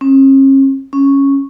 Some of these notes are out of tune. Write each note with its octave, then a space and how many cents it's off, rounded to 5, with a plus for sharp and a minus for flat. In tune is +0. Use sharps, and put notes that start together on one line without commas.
C#4 -45
C#4 -5